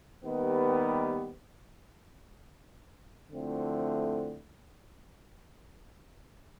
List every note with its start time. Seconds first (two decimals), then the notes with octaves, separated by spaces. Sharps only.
0.23 D#2 D#3 G3 B3
3.31 D3 F3 A3 C4 E4